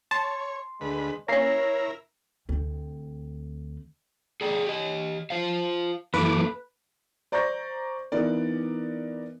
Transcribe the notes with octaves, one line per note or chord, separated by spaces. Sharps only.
C#5 A5 C6
D2 G#3 B4
A#3 C#4 E4 A#4 C#5 A#6 C7
D2 C4
G#4 D5 G5
G4 D#5
F4 C5 F5
F#2 E3 A#3 A4 B4 D6
C5 D5 A#5 C#6 G6 A#6
E3 B3 D#4 A#4 D5